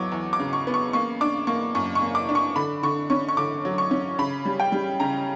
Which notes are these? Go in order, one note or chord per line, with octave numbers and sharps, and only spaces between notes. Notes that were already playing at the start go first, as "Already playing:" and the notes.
Already playing: E2 F#3 B3 C#6 D6
E2
D6
C#3
C#6
B3
C#6
A#3 C#6
D4 D6
A#3 C#6
F#2 C#6
C#6
A#3
D6
D4
C#6
D3 B5
D3 C#6
C#4 C#6
C#6
D3 D6
F#3
C#6
C#4
C#3 B5
G3
G5
G3
C#3 A#5